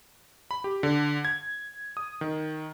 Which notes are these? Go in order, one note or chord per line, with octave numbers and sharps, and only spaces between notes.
B5
G4
D3
G#6
D#6
D#3